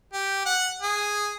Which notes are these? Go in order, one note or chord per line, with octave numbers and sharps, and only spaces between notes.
G4
F#5
G#4